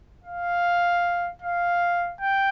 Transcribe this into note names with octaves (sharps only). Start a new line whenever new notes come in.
F5
F5
G5